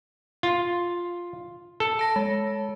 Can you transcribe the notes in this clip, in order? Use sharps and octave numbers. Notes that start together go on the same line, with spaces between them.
F4
A4
A5 A#6
G#3